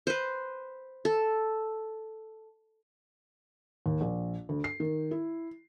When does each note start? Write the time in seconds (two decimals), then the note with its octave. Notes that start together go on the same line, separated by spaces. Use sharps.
0.07 B4 C5
1.05 A4
3.86 D#2
4.01 A#1
4.49 D2
4.64 C7
4.80 D#3
5.11 E4